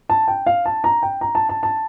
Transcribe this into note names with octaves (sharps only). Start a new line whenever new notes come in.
A5
G5
F5
A5
A#5
G5
A#5
A5
A5
A5